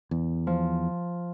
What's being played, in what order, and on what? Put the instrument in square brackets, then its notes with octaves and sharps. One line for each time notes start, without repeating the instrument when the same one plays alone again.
[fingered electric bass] E2
[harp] F3